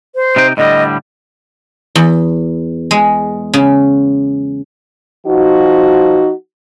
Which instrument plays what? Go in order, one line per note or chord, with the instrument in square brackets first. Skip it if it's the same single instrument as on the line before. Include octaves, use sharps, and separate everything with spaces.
[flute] C5
[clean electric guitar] C3 D#4 G5
[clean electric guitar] A2 D3 G3 [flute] D#5
[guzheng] E2
G#3
C#3
[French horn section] F3 D#4 F#4